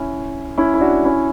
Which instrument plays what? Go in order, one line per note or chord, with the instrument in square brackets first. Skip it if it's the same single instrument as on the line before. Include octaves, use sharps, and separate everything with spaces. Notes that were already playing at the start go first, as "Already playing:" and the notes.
Already playing: [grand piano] C#4 E4
C#4 E4
E4
D4 F#4
C#4 E4